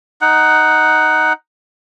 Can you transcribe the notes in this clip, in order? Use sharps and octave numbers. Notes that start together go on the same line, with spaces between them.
D#4 F#5